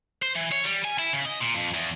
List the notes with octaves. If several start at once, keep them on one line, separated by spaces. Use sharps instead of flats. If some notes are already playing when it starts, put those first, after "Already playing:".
C5
E3
C#5
G3
G#5
E4
C#3
D#5
A#2
F2
E2